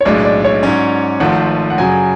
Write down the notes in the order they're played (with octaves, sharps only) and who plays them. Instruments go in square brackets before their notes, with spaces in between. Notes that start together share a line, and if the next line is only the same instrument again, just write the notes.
[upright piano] C#5
[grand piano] B1 A2 G#3 D4 [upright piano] D5
[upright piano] D5
C#5
[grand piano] G#2 F#3 C#4
[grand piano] G#1 G#2 F3 A3 [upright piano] F#5
[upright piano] F#5
[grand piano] F#2 C#3 F#3 [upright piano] G#5